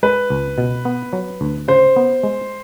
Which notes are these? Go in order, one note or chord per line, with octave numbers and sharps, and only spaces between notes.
G#3 B4
C#2
B2
B3
F#3
D2
C#3 C5
B3
G#3